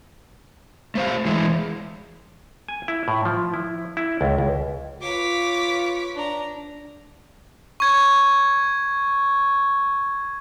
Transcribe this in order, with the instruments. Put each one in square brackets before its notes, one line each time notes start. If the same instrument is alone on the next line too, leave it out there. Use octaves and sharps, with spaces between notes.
[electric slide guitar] A3 C5 F5
E3 G#3 E4
[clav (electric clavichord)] G#5
E4
A2
F3
E4
E4
C#2
C#2
[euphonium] F4 [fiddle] B4 C#5 [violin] D6 B6
[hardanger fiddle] D4 A#5
[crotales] C#6 G#6